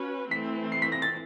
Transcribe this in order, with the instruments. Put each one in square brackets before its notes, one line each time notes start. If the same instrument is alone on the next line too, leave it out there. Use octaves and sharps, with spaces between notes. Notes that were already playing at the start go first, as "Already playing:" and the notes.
Already playing: [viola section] C#4 F#4 B4
[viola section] E3 A3 C4 [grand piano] B6
[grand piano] C7
B6
A#6
A6